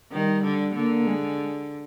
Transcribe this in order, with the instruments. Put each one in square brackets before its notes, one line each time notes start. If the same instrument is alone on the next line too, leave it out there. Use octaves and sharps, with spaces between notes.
[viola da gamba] D#3 [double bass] G3
[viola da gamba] D3
[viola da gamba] D3 [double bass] A#3
[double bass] G#3